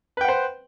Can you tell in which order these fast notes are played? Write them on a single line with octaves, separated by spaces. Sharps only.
B4 G5 F#5 C5